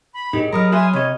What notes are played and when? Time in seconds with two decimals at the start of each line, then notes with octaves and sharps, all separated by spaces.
0.14 B5
0.33 A2 D#4 G4 G#4 A#4
0.53 F#3 A#4 D#5 A#5 B5 D#6 F6
0.72 F#4 G#4 E5 G#5 C6
0.93 C3 C#5 D#5